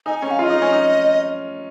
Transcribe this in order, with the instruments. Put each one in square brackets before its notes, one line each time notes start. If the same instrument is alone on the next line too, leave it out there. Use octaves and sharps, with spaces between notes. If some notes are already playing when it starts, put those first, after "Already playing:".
[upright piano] D#4 [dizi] G#5
[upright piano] C#4 [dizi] G#5
[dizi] F5
[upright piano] F4 [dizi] D#5
[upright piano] D#4
C#4
D#4